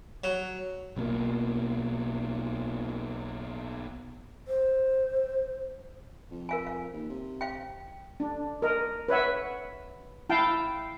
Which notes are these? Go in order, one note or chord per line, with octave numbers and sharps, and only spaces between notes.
F#3
B1 B2 A#3
C5
F2
A#4 F5 G#5
F5
D#2
C3
F5 G5
D4
A#4 D#5
B4 C#5 E5 F#5
E4 F5 G5 A5